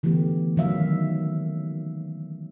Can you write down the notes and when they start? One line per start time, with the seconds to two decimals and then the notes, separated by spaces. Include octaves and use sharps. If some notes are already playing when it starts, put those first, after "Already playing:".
0.03 D3 E3 A3 B3 G4
0.57 D3 D#3 F#3 E5 F5